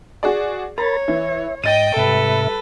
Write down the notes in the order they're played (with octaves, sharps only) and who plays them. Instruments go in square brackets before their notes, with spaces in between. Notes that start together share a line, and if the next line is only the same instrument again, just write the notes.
[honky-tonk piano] F#4 G#4 D5
[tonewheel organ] A#4 B5 A6 [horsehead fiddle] C#5 [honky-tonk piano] A#5
[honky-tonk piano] E3 [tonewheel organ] E5
[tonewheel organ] G#2 [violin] D#5 G5 [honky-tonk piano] A6 D#7
[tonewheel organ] G#2 C3 E5 [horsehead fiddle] G3 B4 [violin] A4